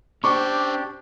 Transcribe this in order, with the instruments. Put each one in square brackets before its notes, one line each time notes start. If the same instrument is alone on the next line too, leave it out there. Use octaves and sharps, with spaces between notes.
[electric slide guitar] C#4 C5 [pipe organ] D4 G4 [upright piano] C#6 D6